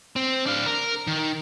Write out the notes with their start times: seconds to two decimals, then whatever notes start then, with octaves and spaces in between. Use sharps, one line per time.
0.16 C4
0.46 D4 F5
0.66 A#4
1.07 D#3